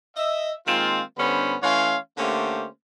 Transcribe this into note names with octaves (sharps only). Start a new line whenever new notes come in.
D#5 E5
D#3 G#3 A#3 C4 F4
G2 D3 B3 C#4 C5 B5
E3 A3 C#4 C#5 F5 C6
D3 A3 A#3 C#4 G4 C5